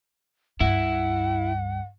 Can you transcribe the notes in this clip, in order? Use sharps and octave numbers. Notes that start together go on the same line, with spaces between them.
C#2 G2 E4 F#5